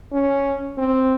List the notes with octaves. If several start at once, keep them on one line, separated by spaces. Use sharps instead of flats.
C#4
C4